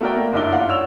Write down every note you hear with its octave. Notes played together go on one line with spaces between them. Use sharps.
A3 B3 F#4 A#4 D5 G5
A#3
F#1 G2 D#4 E4 D5 G7
F4 D5 F5 F#5
C#5 E6 F7